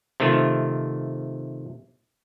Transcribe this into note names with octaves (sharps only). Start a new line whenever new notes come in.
C3 D#3 F3 A3